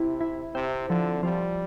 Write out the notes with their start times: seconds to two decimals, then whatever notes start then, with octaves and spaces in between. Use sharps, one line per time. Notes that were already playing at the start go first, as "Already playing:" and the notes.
Already playing: C3 E4
0.21 E4
0.55 C3 C4
0.89 D3 F3
1.23 F3 G3